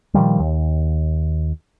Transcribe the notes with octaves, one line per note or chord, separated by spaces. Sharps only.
A#2 D#3 F3 G3
D#2